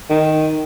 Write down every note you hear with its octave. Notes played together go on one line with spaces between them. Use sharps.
D#3